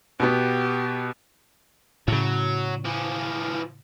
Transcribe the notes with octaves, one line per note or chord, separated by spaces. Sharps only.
B2 B3 G4
A2 C#3 F#3
E3 F3